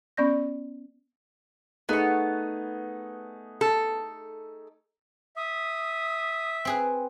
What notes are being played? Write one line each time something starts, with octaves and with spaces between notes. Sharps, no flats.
B3 C#4 D5 G6 A#6
A3 B3 D#4 G#4 C#6
A4
E5 D#6
C4 G#4 B4